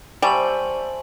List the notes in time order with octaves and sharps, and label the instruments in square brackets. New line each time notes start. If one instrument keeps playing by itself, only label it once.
[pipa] G3 [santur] C5 E5 C#6 [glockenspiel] G#5 A5 F#7